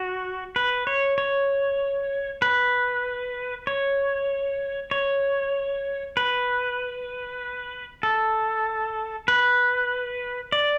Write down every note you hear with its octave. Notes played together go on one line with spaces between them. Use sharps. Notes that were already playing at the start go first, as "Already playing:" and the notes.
Already playing: F#4
B4
C#5
C#5
B4
C#5
C#5
B4
A4
B4
D5